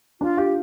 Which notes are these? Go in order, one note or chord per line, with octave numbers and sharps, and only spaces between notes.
D4 F4
F4 G4